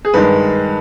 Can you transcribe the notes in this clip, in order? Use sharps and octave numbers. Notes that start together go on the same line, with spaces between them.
G#4
G2 D#3 G#3 B4